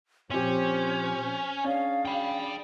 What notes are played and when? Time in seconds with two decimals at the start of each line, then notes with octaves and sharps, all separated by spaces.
0.31 A#2 F3 C4 C#4 G4 C5
1.65 C#4 D4 G#4 D5 F5
2.05 G5 B5